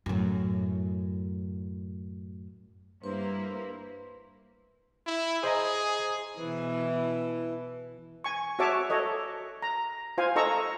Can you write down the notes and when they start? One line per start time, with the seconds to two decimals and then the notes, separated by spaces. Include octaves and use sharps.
0.06 F#2 A2
3.04 G2 A#3 E4 B4 C5
5.07 E4
5.44 G#4 C5 D#5 A#5
6.39 B2 E3 E4 B4
8.24 G#5 C#6
8.59 F#4 G#4 C#5 E5 A5 D6
8.90 A4 C#5 D#5
9.62 A#5
10.18 F4 C5 F5 G#5
10.36 D#4 A4 D#5 A#5 C#6 E6